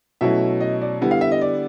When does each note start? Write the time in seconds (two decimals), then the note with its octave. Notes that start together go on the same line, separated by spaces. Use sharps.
0.21 B2 F#3 A3 C#4 E4 E5
0.61 D#5
0.81 D5
1.01 D3 G3 B3 E4
1.11 F5
1.21 E5
1.32 D#5
1.41 D5